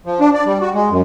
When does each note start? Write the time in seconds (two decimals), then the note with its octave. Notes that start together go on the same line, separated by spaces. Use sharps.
0.06 F3
0.20 D4
0.34 D5
0.46 G3
0.61 F#4
0.74 G#3
0.91 F#2